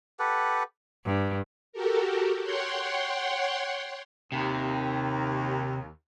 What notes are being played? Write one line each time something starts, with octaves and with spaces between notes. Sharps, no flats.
G4 A4 B4 F#5
G2
F#4 G4 A4 A#4
C#5 F#5 G5 C6
D#2 C3